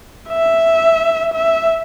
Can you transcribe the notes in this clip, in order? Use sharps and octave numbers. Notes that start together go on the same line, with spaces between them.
E5
E5